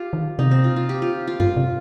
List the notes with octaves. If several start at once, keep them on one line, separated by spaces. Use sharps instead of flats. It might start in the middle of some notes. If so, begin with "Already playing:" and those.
Already playing: F4 G4
D#3
C3 D#4
C4
F4
F4
G4
F4
F4
G2 F4
C3